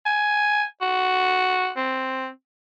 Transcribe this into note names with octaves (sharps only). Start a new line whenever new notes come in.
G#5
F#4
C4